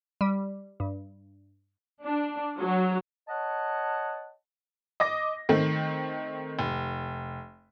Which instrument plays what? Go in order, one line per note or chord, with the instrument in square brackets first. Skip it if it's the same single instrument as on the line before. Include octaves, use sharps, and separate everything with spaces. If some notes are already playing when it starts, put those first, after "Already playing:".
[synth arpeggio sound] G3
G2
[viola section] D4
F#3
[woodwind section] C#5 D#5 F#5 A5
[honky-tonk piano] D#5 D6 A#6
D#3 A3 C4
F1